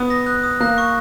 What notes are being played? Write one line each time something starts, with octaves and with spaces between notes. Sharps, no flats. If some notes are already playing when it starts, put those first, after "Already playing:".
Already playing: B3 D#6
A#6
F#6
D#6
A#3 F#6
C#6